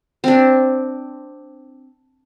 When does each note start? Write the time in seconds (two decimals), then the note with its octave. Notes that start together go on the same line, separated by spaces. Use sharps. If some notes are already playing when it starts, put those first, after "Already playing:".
0.24 C4 D4